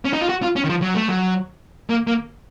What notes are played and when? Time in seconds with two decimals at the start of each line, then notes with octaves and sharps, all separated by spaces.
0.05 C#4
0.13 D#4
0.21 F4
0.29 F#4
0.42 F4
0.56 C#4
0.64 D#3
0.70 F3
0.82 F#3
0.95 A3
1.08 F#3
1.90 A#3
2.07 A#3